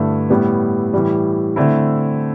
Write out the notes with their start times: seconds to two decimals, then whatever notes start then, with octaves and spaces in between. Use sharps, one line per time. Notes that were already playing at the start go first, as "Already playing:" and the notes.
Already playing: G2 D3 A3 E4
0.30 A2 G3 B3
0.94 A2 E3 G3
1.56 D3 A3 C4 E4